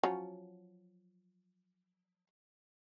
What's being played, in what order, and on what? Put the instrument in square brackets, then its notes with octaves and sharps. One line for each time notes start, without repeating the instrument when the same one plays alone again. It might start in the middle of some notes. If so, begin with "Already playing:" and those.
[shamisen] F3 F#3 C#4